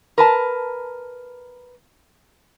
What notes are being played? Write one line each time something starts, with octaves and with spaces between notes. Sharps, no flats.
A#4 B4 A5